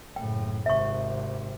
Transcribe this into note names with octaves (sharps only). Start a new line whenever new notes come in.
F#1 A2 G5
G#1 C3 E5 C#6